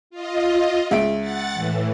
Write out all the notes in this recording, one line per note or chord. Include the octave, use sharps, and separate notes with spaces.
F4 D#5
C#2 E5 D7
F#5 A6
A2 E3